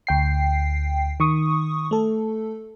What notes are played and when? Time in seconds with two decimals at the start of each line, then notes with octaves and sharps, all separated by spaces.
0.07 D2 G5 C7
1.20 D#3 C#6 D#6
1.91 A3 A4